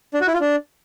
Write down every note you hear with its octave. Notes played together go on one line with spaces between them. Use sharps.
D4
F#4
E4
F4
D4